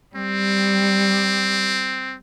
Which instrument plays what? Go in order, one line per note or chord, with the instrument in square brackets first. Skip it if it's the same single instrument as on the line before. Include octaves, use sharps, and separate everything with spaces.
[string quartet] G3 [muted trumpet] C4